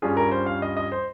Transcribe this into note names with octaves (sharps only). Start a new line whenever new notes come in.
G2 G3 C#4 F4 G#4
A#4
C5
F5
D#5
D#5
C5